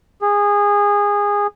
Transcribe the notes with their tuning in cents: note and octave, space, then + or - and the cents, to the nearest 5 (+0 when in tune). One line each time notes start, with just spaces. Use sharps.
G#4 -20